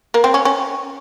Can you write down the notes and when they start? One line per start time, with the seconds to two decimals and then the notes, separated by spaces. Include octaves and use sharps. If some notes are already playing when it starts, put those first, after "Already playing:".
0.14 A#3
0.24 C4
0.34 C#4
0.45 C#4